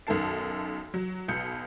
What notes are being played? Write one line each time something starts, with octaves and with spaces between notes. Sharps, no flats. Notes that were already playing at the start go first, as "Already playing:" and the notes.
B1 F#2 D#3 A4 A5 C7
F#3
B1 B2 G6 C#7